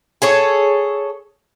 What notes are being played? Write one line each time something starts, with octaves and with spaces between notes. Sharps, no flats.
G#4 A4 C#5